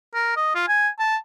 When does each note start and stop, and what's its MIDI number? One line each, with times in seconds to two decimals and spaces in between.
0.14 0.33 70
0.36 0.51 75
0.55 0.68 65
0.68 0.88 80
0.99 1.16 81